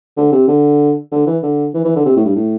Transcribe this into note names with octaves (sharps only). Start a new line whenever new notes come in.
D3
C3
D3
D3
E3
D3
E3
E3
D3
C3
A2
G2
A2